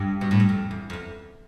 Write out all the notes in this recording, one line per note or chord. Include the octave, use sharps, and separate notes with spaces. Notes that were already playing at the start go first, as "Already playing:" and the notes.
Already playing: G2
B2
A2
G2
F2
E2
F2
E2